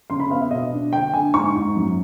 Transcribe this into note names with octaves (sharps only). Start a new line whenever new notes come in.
C#3 C6
B5
B3 F5
E5
B2 D#5
D4
D3 G5
D3 G#5
G#2 C#6
G#2
F#2